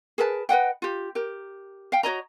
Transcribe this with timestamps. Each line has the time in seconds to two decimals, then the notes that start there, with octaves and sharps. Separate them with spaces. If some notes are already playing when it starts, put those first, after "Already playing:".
0.18 G#4 A#4 B4 A5
0.49 B4 D#5 F#5 G5
0.82 F4 G4
1.15 G4 A#4
1.92 F5 G5
2.03 F#4 C#5 D#5 A#5